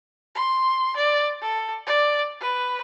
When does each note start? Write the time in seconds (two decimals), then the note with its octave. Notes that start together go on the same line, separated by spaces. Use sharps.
0.35 C6
0.96 D5
1.41 A4
1.86 D5
2.40 B4